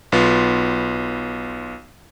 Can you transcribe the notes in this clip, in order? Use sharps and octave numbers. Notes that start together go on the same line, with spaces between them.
B1 B3 F4